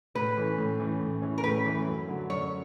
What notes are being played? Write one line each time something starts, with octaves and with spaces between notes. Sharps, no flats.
A2 B4
E3 A3 C#4
A2
E3 A3 C#4
A2
E3 A3 C#4
A#4
A2 B4
E3 A3 C#4
F#2
D3 F#3
F#2 C#5